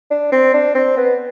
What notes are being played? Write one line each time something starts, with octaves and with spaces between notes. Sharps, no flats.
D4
C4
D4
C4
B3